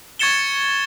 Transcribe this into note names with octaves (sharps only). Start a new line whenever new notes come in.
C#6 G#6 A6 C#7 E7 G7